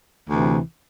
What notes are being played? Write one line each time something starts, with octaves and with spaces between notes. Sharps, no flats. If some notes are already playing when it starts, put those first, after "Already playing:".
D2 C3 E3